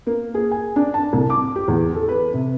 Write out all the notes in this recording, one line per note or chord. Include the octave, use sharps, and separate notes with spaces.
A#3
G#4
G#5
D4
A5
C2
D6
G4
E2
A4
B4
C3